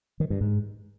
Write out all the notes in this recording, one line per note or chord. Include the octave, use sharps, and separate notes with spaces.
D#3
G2
G#2